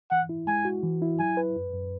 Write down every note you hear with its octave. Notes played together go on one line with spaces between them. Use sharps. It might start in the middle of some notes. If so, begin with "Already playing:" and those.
E3 F#5
E4
G#3 G#5
F#4
E3
E4
F#3 G#5
B4
F#2
F#2